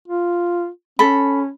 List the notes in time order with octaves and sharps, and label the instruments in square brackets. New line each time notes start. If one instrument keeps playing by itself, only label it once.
[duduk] F4
[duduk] C#4 [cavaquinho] A4 B5